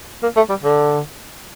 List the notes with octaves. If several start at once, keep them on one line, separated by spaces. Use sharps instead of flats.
A#3
A3
G3
D3